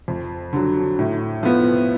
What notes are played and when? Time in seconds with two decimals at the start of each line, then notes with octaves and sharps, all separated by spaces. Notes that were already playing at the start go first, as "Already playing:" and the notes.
0.08 F2
0.53 D3 F#3
0.99 A2
1.43 F3 B3